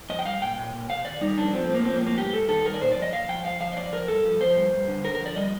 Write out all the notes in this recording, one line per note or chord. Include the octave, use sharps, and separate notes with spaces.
F3 D#5
G5
G3 F5
A#2 G5
A#2
A#2
C3 F5
D#3 D5
G3 D#4
F2 D4
F3 C4
A2 C4
A#3
F3 C4
A#3
A2
A#3
G2 G4
G2 A4
D#3 A4
G2 A#4
D5
A#2 C5
D5
F3
D#5
A#2 F5
F3 G5
F3 F5
F3 F5
D#5
F3 D5
F3 A#4
G2 A4
F3
F3 C5
G2
G2
D3
D3 A#4
A#4
F3
D5
G3 D#5